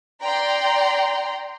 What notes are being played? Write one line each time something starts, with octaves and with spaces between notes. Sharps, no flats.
D5 G5 A#5 C6